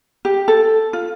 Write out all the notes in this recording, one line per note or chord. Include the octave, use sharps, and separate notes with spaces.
G4
A4
F4